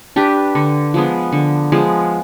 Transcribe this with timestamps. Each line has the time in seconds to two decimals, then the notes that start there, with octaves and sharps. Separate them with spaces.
0.16 D4 G4 B4
0.55 D3
0.94 F3 G#3 B3
1.32 D3
1.72 F3 G#3 B3